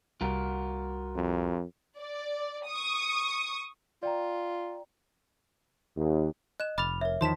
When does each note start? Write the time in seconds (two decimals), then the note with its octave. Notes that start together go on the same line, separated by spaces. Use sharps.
0.21 C2 G3 F4 F#4 A#4
1.16 F2
1.99 D5
2.68 C#6 D#6
4.03 F4 D5 G5 A#5
5.96 D#2
6.60 D#5 F#6 E7
6.78 F1 B5 D6 F6 A6 F7
7.01 A#4 C#5 E5
7.21 E2 D#3 F3 C5 A5 C6 B6 E7